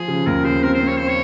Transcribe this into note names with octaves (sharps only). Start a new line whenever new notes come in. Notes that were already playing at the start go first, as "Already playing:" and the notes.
Already playing: F3 G#4
C#3
D#2 A#4
C#3 C5
C4 A#4
C5
C4
C#5
C5
C#5